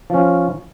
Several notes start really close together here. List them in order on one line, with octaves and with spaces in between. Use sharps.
F3 C#4 F4